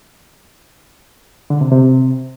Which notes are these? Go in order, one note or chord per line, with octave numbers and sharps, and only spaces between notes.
D3
C3
C3